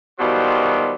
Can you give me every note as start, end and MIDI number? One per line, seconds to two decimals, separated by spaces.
0.19 0.95 47
0.19 0.95 51
0.19 0.95 54
0.19 0.95 55
0.19 0.95 65
0.19 0.95 72